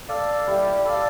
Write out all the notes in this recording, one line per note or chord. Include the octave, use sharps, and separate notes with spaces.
A4 D5 F5
G3 E4
A4 D5 F5